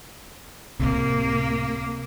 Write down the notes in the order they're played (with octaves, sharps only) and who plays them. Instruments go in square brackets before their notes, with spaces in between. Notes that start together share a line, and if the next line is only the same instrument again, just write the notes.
[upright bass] C#2 A2 [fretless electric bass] C3 [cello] A#3